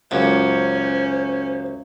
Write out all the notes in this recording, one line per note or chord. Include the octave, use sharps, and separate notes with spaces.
C#2 F#2 C#4 C5